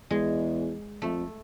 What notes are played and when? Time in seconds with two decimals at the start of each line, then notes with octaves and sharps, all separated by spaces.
0.10 E2 G#3
1.02 F2 A3